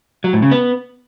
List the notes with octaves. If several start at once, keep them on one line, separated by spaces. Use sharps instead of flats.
F#3
A2
C#3
B3